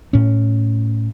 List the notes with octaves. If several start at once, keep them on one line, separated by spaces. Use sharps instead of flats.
A2 C#4